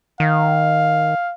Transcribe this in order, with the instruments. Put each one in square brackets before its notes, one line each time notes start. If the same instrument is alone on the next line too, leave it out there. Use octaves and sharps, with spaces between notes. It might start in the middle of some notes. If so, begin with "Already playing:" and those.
[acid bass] D#3 [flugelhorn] F5